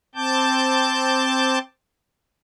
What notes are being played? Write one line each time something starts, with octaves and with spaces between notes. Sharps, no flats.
C4 A5 D6 G6